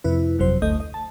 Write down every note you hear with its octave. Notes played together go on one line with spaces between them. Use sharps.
F2 C3 E4 B4
G1 F2 C3 F#3 C5
G1 D2 A3 D#5 G6
D#5
A5